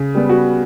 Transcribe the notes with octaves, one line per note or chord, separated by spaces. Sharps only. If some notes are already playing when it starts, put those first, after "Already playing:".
Already playing: C#3
G3 B3
F#4